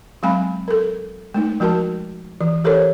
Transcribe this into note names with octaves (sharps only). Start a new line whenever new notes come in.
F#3 G#3 C4 F5 G#5 B5
A4 A#4
G#3 A3 D#4
F3 G#3 F#4 A#4 A5
E3
G4 A4 A#4 C5 C#5